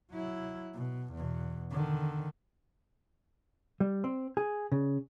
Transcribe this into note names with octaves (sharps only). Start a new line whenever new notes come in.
F#3 E4
B2
E2 B2
D3 D#3
G3
C4
G#4
C#3